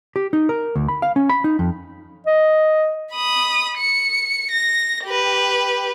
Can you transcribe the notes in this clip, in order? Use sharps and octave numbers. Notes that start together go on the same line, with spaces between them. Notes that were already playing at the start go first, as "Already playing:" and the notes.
G4
D#4
A#4
D2
B5
F5
C#4
B5
D#4
F2
D#5
B5 D#6
C#7
A#6
G4 B4